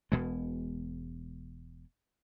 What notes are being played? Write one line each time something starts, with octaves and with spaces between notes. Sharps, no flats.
E1 B2 G#3